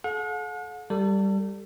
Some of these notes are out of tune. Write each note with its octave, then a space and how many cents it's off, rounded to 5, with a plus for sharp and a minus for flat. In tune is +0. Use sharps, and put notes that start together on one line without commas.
A4 -40 F#5 -45
G3 +0 A4 +30